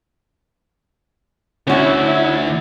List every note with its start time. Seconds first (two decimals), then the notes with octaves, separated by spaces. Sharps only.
1.67 D2 C#4 E4 F#4